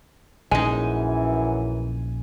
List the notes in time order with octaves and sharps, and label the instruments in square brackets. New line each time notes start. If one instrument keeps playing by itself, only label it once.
[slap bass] A#1 A#2 C#4 [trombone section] F#2 E3 [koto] G#3 D#4 [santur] G#5